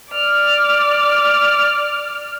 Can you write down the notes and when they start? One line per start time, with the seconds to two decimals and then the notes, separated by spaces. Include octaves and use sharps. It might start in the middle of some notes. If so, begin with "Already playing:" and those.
0.11 D5 F6